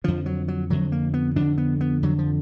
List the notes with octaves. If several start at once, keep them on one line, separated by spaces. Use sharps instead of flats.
F2 D3 F3
F#3
F#3
F2 D3 F#3
A#3
B3
F2 D3 D4
B3
B3
F2 D3 F#3
F3